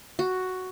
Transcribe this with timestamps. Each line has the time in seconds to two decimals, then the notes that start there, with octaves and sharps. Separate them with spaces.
0.19 F#4